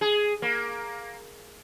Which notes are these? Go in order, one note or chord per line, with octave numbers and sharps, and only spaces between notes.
G#4
A#3